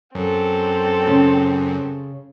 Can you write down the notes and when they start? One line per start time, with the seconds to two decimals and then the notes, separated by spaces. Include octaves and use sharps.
0.15 F#2 C4 A4
1.07 C#3